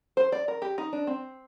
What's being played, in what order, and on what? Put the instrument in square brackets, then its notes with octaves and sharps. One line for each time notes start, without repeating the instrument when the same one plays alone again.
[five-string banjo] C5
D5
A#4
G4
D#4
D4
C4